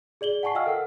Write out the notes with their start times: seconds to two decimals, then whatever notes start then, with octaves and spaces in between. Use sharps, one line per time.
0.21 G#4 D5 F#7 G7
0.43 F#5 G#5 A5 C#6 C7
0.54 D#5 F5 G5 E6 F6
0.66 A4 A#4 F#5